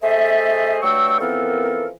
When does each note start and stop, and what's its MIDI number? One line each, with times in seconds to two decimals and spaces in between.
0.02 0.77 57
0.02 0.77 68
0.02 0.77 69
0.02 0.77 72
0.02 0.77 75
0.02 0.77 76
0.82 1.17 43
0.82 1.17 54
0.82 1.17 57
0.82 1.17 79
0.82 1.17 85
0.82 1.17 88
1.20 1.88 52
1.20 1.88 53
1.20 1.88 59
1.20 1.88 60
1.20 1.88 69
1.20 1.88 70